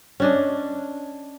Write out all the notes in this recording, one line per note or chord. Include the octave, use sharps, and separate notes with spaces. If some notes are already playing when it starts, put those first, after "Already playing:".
C#4 D4 D#5